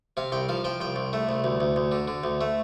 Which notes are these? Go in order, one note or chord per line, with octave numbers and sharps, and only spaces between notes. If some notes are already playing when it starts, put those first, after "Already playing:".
C3 F5
C2 G5
F3 F5
F3 G5
C2 G5
C2
A3
C2
D2
D2
D2
D3
D3
D2
A3